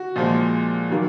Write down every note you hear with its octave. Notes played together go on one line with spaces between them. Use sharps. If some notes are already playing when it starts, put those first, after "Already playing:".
Already playing: F#4
A#2 F3 G#3
D#3 F#3 A#3